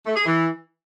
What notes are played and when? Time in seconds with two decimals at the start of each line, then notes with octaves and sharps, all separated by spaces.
0.06 A3
0.16 G#4
0.26 E3